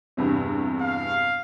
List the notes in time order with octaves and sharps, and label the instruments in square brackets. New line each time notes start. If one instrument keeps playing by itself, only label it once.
[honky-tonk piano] E2 G2 C3
[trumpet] F5